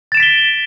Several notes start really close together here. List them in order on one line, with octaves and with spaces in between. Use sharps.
A6 E7 D7 B6 G7